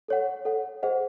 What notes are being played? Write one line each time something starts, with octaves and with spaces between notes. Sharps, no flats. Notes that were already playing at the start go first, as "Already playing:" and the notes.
A4 C#5 F#5
A4 C#5 F#5
G#4 C5 D#5 F#5